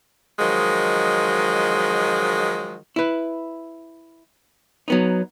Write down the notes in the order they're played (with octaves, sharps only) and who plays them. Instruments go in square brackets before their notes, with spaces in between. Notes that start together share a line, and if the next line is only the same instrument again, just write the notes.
[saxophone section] D#3 F3 F#3 G#3
[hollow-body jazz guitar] E4 B4
F#3 B3 D#4